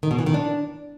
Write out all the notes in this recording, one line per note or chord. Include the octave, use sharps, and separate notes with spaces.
D#3
B2
E3
D#3
D4